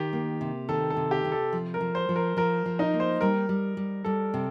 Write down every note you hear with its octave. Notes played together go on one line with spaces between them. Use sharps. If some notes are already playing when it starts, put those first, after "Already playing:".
Already playing: D#3 G4
A#3
C3
D#3 A4
A4
C3
G4
C3
A4
F3
A#4
F3
C5
F3
A#4
F3 A#4
F3
D#4
A#3
C5
G3 A#4
G3
G3
G3 A4
C3